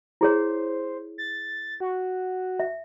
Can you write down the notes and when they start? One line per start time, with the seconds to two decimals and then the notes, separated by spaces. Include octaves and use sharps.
0.21 E4 G#4 C5 C#5
1.18 A6
1.80 F#4
2.60 E5